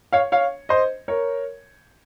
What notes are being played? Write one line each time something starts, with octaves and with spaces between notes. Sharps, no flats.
C#5 F5
C#5 F5
C5 D#5
A#4 C#5